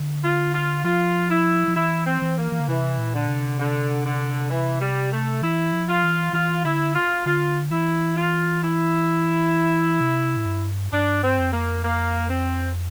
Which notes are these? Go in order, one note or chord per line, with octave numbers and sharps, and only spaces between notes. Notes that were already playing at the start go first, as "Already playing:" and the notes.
Already playing: D3
F4
F4
F3 F4
E4
F3
E3 E4
C4
E3
A#3
E3
D3
C3 E3
A#2
D3
C3
D3
D3
E3
G3
A3
E3 E4
F3
F4
E3
E3 F4
D3 E4
F4
D3 F4
E3 E4
F4
E4
C3
A2
G2
G2 D4
C4
F2
A#3
A#3
C4